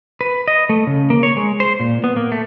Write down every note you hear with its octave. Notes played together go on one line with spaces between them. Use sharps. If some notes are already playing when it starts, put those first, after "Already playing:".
B4
D#5
A3
C#3
A#3
C#5
G#3
C5
A#2
B3
A#3
A3